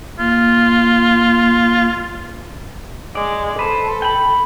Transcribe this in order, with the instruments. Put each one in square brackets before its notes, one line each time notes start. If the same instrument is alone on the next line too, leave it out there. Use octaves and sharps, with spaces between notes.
[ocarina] A#3 [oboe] F4
[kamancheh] G#3 [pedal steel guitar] D5
[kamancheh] A4 [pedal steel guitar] B4 C5
[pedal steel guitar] G5 B5